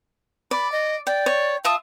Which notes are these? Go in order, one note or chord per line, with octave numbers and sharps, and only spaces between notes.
D5 B5
D#5
D5 G5
C#5
F4 E5 A5 D#6